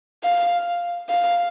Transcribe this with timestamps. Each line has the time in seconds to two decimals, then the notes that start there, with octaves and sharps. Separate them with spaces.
0.24 F5
1.09 F5